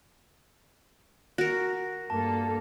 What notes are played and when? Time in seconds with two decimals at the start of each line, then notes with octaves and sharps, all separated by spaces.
1.38 F#4 A#4 A#6
2.10 G2 A#3 A4 A5